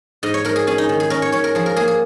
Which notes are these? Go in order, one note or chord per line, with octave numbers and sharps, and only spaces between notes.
G#2 D#5
C#5
G#2 A#4
G#4
C#4 G#4
D#4
D#3
G#4
C#4 A#4
C#5
C#4 C#5
A#4
F3 G#4
A#4
A#3 G#4
G#4